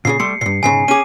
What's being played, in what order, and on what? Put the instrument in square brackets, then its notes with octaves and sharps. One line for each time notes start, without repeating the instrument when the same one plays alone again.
[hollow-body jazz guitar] A#2 C#3 G#4 [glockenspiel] C7
[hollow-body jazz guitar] G3 A3 C6 [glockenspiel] C#7
[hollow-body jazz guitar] G2 A#2 [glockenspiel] C7
[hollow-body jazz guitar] B1 G#2 C#3 [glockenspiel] G#5 C7
[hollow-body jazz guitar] C#4 G#4 [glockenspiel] D6 D#7